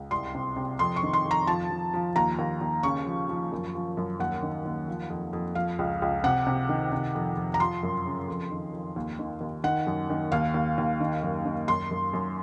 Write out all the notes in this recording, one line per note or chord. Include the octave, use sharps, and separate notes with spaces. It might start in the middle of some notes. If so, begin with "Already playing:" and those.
Already playing: C#2
C2 C6
C3
C3
F2 C6
C#6
D#3
C6
F2
A#5
F3 A5
F3
F3
D#2 A#5
D#2
D#2
C#3 C#6
F3
F3
F#2
F3
F#2
D#2 F#5
D#3
D#2
F3
F2
F2
F3 F5
C#2
C#2
C3 F#5
C3
D#3
C3
F2
F2
A#5
F3 C6
F#2
C#3
F2
D#3
F2
D#2
D#3
D#2
D#3 F#5
F#2
D#3
D#2 F5
D#2
D#2
D#3
F#2
D#3
F#2 C6
F#2
F#2